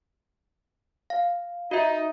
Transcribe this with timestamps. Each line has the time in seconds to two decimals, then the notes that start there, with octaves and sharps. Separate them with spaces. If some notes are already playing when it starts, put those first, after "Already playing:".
1.10 F5
1.71 D#4 F#4 E5